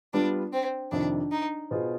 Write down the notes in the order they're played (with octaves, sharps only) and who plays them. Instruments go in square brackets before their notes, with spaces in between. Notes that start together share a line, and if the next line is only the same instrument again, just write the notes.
[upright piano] G3 B3 F4 [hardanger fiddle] D4
[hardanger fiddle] C4
[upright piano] F2 C3 D#3 [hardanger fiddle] D4
[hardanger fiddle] D#4
[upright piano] B2 B3 F4 G#4 C5